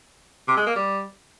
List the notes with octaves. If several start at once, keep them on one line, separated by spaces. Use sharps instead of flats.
C3
G#3
A#3
G3